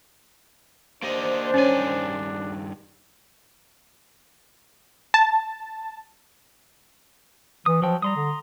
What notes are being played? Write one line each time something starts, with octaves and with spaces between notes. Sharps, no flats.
A#3 D4 G4 C5 D#5
G2 D#3 C#4 C#5 G#5
A5
E3 D#6
F3 F#3 G5
G3 A#5 C6 D#6
D3